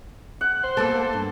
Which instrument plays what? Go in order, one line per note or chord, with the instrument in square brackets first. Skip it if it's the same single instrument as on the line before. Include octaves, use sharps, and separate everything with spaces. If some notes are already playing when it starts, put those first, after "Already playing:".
[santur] F#5
[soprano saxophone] C5
[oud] A#3 B3 A4 [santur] A5
[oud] G2